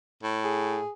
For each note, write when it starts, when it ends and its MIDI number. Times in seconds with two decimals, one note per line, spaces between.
0.23 0.81 45
0.44 0.91 68